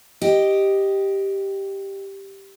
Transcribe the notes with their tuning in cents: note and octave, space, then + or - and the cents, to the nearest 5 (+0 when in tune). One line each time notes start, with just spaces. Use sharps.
G4 +0 D#5 +0